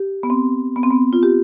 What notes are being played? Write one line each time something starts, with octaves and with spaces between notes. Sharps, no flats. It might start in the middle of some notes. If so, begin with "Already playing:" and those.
Already playing: G4
B3
C4
B3
C4
B3
F4
G4